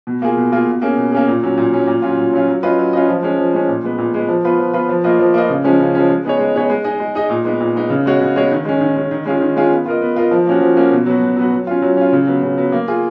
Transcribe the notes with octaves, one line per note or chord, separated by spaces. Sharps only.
B2
A#3 F4 G#4
B2
A#3 F4 G#4
B2
A#3 C#4 G#4
B2
A#3 C#4 G#4
A#2
F#3 C#4
A#2
F#3 C#4
A#2
F#3 C#4 F4
A#2
F#3 C#4 F4
F#3
C#4 F4 B4 D#5
F#3
C#4 F4 B4 D#5
F3
G#3 C#4
F3
G#3 C#4
A#2
G#3 B3
A#2
G#3 B3
F3
B3 F4 B4
F3
B3 F4 B4
F3
A#3 F4 B4 D#5
F3
A#3 F4 B4 D#5
C#3
F3 G#3 C#4
C#3
F3 G#3 C#4
G#3
B3 D#4 G#4 C#5
G#3
B3 D#4 G#4 C#5
G#3
D#4 G#4 D#5
G#3
D#4 G#4 D#5
A#2
G#3 B3 D#4
A#2
G#3 B3 D#4
C#3
G#3 B3 F#4 C#5
C#3
G#3 B3 F#4 C#5
D#3
G#3 C#4
D#3
G#3 C#4
D#3
G#3 C#4 F4 G#4
D#3
G#3 C#4 F4 G#4
B3
F4 A#4 D#5
B3
F4 A#4 D#5
F3
A#3 C#4 F#4
F3
A#3 C#4 F#4
B2
F#3 B3 F#4
B2
F#3 B3 F#4
F#3
C#4 F4
F#3
C#4 F4
C#3
F#3 B3
C#3
F#3 B3
A#3
F4 G#4